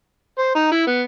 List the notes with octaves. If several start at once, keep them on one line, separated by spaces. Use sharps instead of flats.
C5
D#4
E4
B3